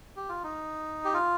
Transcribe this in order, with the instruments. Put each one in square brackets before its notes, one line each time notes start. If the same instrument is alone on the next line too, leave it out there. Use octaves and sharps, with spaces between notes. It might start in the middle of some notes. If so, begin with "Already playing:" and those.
[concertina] G4
F4
D#4
G4
F4